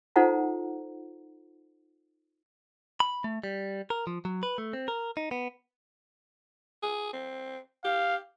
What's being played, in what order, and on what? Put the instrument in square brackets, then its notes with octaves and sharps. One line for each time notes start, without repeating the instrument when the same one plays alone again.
[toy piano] D#4 F4 A4 C5 F#5 A#5
[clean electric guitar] B5
A3
G3
A#4
F3
F#3
B4
A3
C4
A#4
D#4
B3
[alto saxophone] G#4
C4
[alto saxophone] G4 [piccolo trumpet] F5